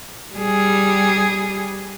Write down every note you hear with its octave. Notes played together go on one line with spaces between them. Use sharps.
G3 G#4